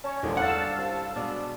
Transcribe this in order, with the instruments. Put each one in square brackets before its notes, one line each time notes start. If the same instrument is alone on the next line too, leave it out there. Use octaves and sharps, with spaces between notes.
[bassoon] C#4 [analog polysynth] C#5 [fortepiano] A5
[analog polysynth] E2 A#2 F3 [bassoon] D3 [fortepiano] D#3 G#3 C#4
[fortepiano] G2 C#5 [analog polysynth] F5 A5 E6 [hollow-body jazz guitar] F#5
[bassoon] C2
[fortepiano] B2 G#3 [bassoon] D4